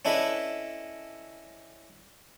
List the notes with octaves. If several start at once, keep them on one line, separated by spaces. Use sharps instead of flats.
C#4 D4 E4 A4 B4 D#5